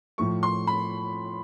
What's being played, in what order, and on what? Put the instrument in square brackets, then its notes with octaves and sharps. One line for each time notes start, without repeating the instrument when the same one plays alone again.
[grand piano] A2 F3 A3 [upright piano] C#6
[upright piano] C6
B5